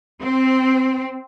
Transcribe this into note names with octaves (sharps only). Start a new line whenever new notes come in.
C4